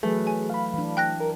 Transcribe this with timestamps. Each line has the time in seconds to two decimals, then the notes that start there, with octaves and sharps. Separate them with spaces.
0.03 E3 F#3 A3 G#4 B4
0.27 G#5
0.50 F5 B5
0.74 E3 D4
0.97 G5 F#6 A#6
1.20 A#4